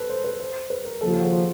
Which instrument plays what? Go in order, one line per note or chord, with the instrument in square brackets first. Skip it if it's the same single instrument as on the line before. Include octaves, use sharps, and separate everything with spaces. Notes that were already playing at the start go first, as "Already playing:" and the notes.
Already playing: [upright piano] A4 B4
C5
B4
C5
B4
A#4
[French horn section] D#2 C#3 F3 A#3 [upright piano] A4
[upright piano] G#4
F#4
F4